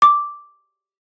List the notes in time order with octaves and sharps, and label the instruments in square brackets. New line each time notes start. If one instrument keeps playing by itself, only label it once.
[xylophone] D6